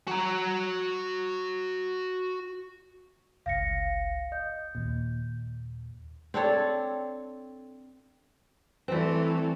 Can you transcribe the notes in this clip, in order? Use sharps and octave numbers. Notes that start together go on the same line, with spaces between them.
F#4 A#5
G1 C#2 F5 A#6 C#7
D#5 G6
D#2 A#2
C4 D4 A4 C#5
E3 G3 A3 C4